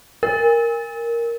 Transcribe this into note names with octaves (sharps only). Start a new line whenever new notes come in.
A#4